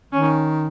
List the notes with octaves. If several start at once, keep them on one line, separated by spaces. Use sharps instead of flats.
D#3 C#4